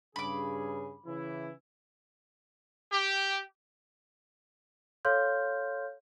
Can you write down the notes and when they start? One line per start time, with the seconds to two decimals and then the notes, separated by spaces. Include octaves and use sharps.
0.16 G2 C#3 G#4 B5 D6
1.06 C#3 E3 E4
2.92 G4
5.05 A4 C#5 F5 C6 F6 G6